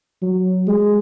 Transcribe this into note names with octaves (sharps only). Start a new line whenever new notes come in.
F#3
G#3